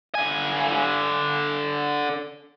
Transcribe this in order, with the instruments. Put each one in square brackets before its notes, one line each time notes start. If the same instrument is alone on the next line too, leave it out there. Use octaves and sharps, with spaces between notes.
[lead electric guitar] D3 G#5